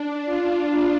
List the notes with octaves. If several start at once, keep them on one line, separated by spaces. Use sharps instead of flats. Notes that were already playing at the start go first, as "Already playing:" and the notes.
Already playing: D4
F4